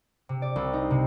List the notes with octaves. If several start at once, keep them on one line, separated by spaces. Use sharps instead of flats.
C3
D5
C2
D#4
C3